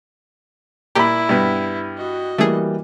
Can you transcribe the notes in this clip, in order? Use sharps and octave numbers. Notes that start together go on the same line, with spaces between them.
A#2 E4 G4 B5
G2 B2 B3
F#4 D#5
E3 G3 A3 A#3 G#4